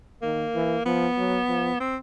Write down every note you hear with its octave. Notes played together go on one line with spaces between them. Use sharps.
D#3 A#3
E3
F3 B3
F#3
F3
C4